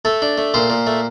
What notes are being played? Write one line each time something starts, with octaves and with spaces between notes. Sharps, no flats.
A3 A4
D4
A3
A#2 C5
A#2
A3